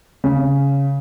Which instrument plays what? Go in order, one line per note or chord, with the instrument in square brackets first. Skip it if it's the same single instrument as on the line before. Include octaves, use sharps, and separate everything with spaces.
[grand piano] C#3